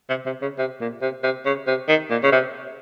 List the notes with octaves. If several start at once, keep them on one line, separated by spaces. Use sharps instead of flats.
C3
C3
C#3
C3
A#2
C3
C3
C#3
C3
D#3
A#2
C#3
C3